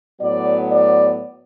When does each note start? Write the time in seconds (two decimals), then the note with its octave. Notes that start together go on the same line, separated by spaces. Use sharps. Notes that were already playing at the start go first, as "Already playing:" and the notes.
0.21 A2 F#3 B3 D5
0.72 D5